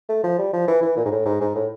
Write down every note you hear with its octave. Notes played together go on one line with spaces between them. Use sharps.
A3
F3
G3
F3
E3
E3
A#2
G#2
A2
G#2
G#2
A2